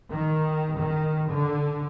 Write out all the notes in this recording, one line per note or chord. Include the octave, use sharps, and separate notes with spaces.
D#3
D#3
D3